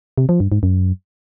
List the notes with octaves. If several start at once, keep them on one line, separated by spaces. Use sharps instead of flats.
C3
F3
G2
G#2
F#2